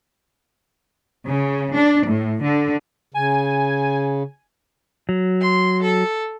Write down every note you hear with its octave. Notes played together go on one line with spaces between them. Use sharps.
C#3
D4
A2
D3
C#3 G#5
F#3
C6
A4